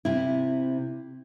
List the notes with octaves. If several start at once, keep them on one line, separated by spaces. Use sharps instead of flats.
C3 E4